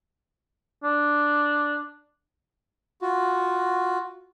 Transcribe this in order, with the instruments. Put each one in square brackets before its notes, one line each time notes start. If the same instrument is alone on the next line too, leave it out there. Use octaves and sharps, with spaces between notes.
[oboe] D4
[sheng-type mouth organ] F4 F#4